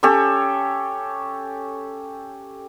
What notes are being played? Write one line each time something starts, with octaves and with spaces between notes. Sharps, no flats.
C#4 G4 A4 C#5